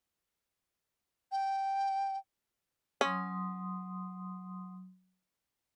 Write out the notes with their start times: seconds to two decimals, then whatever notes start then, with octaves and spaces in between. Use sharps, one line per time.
1.31 G5
3.01 F#3 C#4 C6 D#6